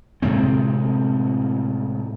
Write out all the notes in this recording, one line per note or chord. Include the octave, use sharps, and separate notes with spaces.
A2 C3 G#3 C4